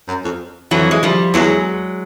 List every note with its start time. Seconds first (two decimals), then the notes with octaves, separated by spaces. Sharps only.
0.08 F#2
0.25 F2
0.71 F2 E3 F#3
0.91 G#3
1.03 F3 G3
1.34 E2 F#3 G#3